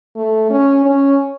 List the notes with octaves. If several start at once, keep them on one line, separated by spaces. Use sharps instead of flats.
A3
C#4
C#4